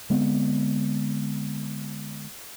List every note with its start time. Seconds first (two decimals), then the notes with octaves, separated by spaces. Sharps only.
0.10 D3 G#3 B3 C4